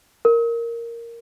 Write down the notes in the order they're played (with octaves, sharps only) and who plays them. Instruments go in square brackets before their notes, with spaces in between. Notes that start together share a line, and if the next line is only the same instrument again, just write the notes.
[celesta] A#4